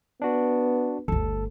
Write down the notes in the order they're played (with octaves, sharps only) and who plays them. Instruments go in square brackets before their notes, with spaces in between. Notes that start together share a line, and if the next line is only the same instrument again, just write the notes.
[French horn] B3 [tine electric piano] D4 F#4
[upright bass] G1 D2 [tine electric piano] A4